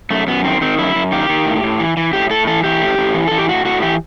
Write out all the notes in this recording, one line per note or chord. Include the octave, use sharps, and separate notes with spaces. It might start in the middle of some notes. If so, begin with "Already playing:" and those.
F#2 A3
F#2 B3
D#3 C4
D#3 C4
F#2 E4
F#2
D#3 G4
D#3
A2
A2
E3
E3
A2 G4
A2 A4
E3 A4
E3 G4
A2
A2
E3
E3 A4
G4
A2 F#4
A2 F#4
E3 G4